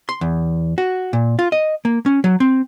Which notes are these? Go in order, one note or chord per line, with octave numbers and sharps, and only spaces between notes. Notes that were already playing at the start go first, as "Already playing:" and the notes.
C6
E2
F#4
A#2
F4
D#5
A#3
C#4
F#3
C4